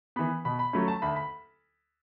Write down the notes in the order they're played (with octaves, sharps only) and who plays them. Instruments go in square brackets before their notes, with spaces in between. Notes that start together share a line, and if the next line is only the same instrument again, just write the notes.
[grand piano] E3 B3 B5
B2 B5
B5
F#3 A3 C#4 B5
A5
D2 B5
B5